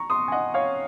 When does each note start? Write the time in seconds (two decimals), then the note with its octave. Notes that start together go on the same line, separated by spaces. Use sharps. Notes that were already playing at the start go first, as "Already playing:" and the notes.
Already playing: A#5 C#6
0.10 C6 D#6
0.28 G#5
0.32 D#5 F#5
0.54 C#5 F5